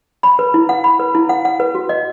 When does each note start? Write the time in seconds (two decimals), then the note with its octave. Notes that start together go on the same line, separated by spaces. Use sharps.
0.23 B5
0.39 B4
0.54 E4
0.69 F#5
0.84 B5
1.00 B4
1.15 E4
1.29 F#5
1.45 F#5
1.60 B4
1.75 F#4
1.89 D#5